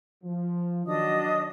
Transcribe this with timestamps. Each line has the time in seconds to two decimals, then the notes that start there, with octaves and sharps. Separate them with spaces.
0.24 F3
0.86 D#3 F#3 D4 D#5 D#6